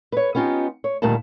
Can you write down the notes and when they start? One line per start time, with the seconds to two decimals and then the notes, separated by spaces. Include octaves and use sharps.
0.12 B4 C#5
0.35 B3 C#4 D#4 F4 G4
0.84 C#5
1.02 D2 A#2 D#3 G3 A5